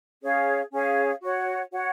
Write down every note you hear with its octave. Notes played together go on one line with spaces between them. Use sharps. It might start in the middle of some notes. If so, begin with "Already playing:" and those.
C#4 G#4 C#5 F5
C#4 G#4 C#5 F5
F#4 C#5 F#5
F#4 C#5 F#5